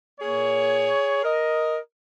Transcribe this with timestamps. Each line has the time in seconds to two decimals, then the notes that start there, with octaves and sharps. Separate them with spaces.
0.20 A#2 A#3 G#4 C#5
1.24 A#4 D#5